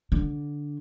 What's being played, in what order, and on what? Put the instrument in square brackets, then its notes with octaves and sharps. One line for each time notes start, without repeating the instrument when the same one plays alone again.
[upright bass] D3